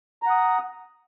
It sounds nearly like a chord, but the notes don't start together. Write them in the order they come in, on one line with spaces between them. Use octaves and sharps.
A#5 F#5 D#6